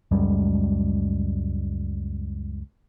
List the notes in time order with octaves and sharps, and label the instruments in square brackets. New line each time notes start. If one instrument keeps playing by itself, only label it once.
[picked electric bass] C#2 F#2 G3 G#3